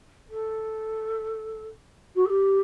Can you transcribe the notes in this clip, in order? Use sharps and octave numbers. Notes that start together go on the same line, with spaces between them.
A4
F#4
A4
G4